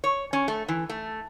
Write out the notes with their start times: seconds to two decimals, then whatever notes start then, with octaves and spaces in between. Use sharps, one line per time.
0.04 C#5
0.33 C#4
0.48 A3
0.68 E3
0.89 A3